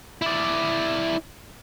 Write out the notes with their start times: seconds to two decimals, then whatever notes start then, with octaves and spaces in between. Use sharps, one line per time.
0.22 E4 D5